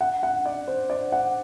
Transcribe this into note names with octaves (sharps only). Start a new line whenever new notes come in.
F#5
F#5
D5
C5
D5
F#5